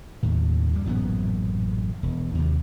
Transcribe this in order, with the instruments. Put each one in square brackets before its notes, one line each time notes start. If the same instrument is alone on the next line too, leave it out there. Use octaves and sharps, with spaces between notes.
[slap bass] D#2 A2
G2 G3
A1 F#2 A#2 B3
E1
D#2 C3